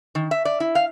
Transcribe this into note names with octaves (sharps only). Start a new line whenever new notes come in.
D#3
E5
D5
E4
F5